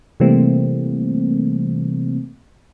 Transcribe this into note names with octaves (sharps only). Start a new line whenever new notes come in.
C3 E3 G3 A3 A#3 C4